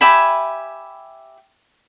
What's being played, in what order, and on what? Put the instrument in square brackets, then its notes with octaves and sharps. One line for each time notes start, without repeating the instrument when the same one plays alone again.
[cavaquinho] G4 E5 G#5 B5